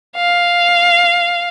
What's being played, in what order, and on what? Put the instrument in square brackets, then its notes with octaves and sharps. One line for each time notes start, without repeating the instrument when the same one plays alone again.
[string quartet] F5